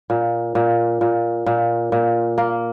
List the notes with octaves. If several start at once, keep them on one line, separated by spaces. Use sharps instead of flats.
A#2
A#2
A#2
A#2
A#2
A#3